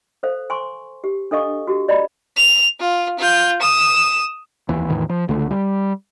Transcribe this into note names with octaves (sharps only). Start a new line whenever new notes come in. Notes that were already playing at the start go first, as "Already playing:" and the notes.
A4 C5 F5
G#5 C6 C#6
G4
D4 A4 D#5 F5 C#6
F#4 G4
D5 D#5 A#5 B5
F7
F4
F4 G6
D#6 E7
F1 D#2 E3
E2 A2 D#3 E3
F3
C#2 D3 A3
G3